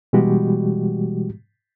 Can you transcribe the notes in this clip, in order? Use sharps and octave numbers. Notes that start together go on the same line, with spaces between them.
B2 E3 G3 G#3 F#4 G4